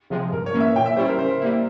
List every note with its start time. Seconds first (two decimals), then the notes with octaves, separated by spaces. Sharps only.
0.10 C3 F3 G#3
0.33 G2 A#4
0.46 C#5
0.53 E3 A#3 C#4
0.60 E5
0.75 A#2 G5
0.86 E5
0.97 G3 C#4 E4 C5
1.09 A#4
1.18 C#3 C5
1.40 G3 A#3 E4